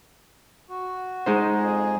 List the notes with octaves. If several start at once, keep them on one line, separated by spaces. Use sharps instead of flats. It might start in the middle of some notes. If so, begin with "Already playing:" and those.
F#4
G#3 D#4 C5
F2 G#4